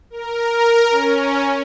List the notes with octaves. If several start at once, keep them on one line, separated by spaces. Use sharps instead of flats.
A#4
C#4